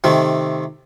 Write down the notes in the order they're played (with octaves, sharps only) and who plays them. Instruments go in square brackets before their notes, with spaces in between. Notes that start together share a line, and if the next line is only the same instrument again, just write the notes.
[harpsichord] C3 D#3 A3